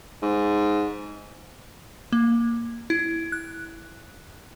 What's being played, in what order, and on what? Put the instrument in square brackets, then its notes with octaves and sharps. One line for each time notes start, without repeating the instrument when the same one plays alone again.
[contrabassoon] G#2
[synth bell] A#3
E4
F#6